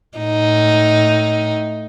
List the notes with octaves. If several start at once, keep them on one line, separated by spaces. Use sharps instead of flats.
A2 D#4